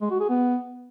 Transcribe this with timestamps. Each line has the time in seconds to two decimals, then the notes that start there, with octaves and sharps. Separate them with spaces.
0.01 G#3
0.11 F#4
0.20 G#4
0.29 B3